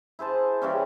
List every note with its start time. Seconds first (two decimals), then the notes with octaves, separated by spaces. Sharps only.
0.19 E4 G#4 C5 A5
0.62 C#3 E3 G3 C#4